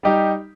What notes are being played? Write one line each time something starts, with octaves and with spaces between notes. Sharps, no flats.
G3 D#4 G4